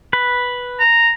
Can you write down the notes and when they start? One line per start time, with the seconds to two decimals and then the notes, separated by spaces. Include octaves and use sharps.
0.13 B4
0.79 A#5